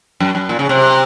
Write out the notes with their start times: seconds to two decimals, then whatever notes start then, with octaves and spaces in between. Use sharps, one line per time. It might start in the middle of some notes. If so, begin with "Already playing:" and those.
0.20 F#2
0.35 F#2
0.49 A#2
0.59 C#3
0.69 C3